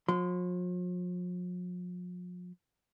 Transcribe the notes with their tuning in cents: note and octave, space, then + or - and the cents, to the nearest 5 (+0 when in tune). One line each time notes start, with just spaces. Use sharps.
F3 +45 C6 -30